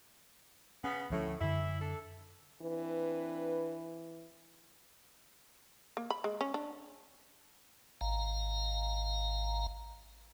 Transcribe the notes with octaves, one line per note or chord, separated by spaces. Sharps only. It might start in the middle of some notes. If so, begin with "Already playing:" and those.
C#3 B3 C#4
D2 A2 F3 C#4
F#2 D3 E3 E4
D4 A4
E3 C4 D4 B4
A#3
B5
G#3
C#4
D4
G#1 F5 A#5